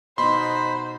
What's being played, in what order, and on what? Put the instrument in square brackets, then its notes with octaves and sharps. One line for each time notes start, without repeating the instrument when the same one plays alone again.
[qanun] B2 D#4 [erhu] C5 [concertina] B5 [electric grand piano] C6